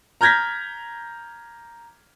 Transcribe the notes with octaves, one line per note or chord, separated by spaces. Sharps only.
A#5 F6 G6 G#6 A#6 B6